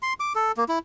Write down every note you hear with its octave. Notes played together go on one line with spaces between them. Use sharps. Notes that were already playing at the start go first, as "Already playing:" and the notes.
C6
D6
A4
A#3
E4